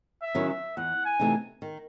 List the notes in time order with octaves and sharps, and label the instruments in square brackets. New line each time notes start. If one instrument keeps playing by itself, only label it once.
[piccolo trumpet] E5
[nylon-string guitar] D#3 F#3 C#4 E4
[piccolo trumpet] E5
[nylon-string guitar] E2 [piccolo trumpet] F#5
[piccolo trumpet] G#5
[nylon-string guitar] C3 E3 A3 D#4
D#3